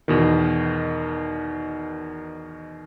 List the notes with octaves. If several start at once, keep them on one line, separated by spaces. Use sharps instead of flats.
E2 B2 D#3